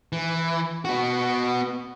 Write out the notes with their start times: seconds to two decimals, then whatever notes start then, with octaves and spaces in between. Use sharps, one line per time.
0.12 E3
0.85 B3 F#4